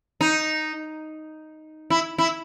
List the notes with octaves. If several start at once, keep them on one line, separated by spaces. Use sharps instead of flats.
D#4
E4
E4